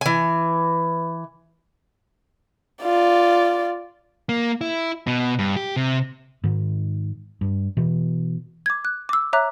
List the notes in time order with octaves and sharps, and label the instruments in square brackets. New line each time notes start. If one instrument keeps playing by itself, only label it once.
[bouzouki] E3 G#5
[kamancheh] F4 D5
[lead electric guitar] A#3
E4
B2
G2
G4
C3
[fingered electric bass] G#2 D#3
G2
B2 E3
[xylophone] D6 G#6
F#6
D6 E6
C#5 E5 A#5 D6 F#6